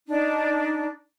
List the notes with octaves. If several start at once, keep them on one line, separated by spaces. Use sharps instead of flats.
D4 D#4